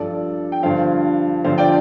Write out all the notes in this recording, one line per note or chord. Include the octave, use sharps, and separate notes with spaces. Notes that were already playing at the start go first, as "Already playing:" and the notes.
Already playing: G2 F3 A4 D5
G5
G2 D3 F3 C5 F5
G2 D3 F3 C5 F5
D5 G5